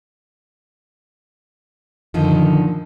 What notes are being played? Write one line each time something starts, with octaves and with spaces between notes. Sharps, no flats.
F#2 A#2 D3 D#3 F3